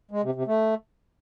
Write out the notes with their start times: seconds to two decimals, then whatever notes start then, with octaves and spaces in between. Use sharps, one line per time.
0.11 G#3
0.23 C3
0.35 C3
0.47 A3